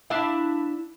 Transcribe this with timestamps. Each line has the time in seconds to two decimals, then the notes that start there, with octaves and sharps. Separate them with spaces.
0.10 D4 E4 F5